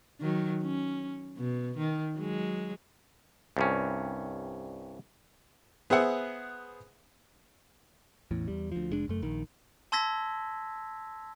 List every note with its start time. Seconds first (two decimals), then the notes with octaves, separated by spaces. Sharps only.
0.20 D#3 F#3
0.62 C#4
1.37 B2
1.77 D#3
2.15 F#3 G#3
3.57 C2 G2 C#4
5.90 B3 G#4 C5 E5 F#5
8.31 A1 E2 A2
8.48 E2 G3
8.72 D2 F3
8.91 F1 G#3 D4
9.08 F#1 F#2 A3
9.22 A#1 D#3
9.92 A5 C6 E6 G#6 A#6 B6